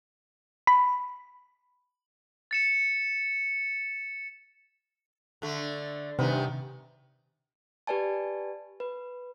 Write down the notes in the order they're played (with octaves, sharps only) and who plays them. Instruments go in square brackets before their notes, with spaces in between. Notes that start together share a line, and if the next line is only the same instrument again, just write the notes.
[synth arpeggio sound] B5
[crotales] A6 C#7 E7
[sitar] D3 A3
[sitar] G2 D#3 B3 [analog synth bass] C3
[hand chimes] G4 B4 D5 G#5 A5
B4